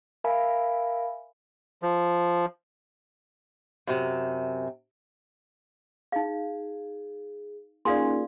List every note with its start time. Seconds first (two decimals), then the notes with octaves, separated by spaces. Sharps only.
0.24 A#4 E5 F5 G#5 B5
1.82 F3
3.87 F#2 C3
6.12 D#4 G#4 F5
7.85 A#3 C#4 D#4 F4 G#4 D5 F5 C6